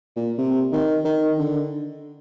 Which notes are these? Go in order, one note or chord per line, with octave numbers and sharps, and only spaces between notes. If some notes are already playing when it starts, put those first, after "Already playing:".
A#2
C3
D#3
D#3
D3